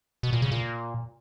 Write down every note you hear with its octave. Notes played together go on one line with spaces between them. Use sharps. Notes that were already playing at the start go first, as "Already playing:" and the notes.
B2
A#2
C#3
A#2